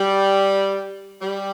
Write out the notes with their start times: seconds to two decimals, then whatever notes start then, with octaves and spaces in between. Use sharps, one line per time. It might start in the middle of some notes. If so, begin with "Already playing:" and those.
Already playing: G3
1.22 G3